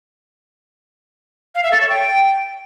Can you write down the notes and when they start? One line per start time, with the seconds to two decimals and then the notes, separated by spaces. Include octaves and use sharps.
1.54 F5
1.63 E5
1.71 A4
1.80 C#5
1.88 G5